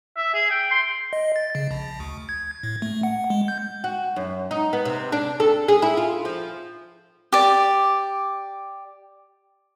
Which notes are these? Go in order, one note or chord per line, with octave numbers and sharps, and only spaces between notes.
E5
G#4
G5
C6
D#5
A6
C#3
A#1
D2
G#6
A2
A3
F#5
G#3
G6
F#4
F#2
D#4
B3
C3
D4
A4
G#4
E4
F4
F3
G4 D5